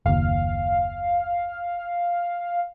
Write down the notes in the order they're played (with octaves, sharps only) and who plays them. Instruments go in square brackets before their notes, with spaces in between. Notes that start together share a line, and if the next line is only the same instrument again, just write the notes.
[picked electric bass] F#1 D#2 [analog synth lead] F5